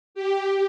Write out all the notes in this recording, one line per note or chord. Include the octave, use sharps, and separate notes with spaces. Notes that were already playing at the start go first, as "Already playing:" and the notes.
G4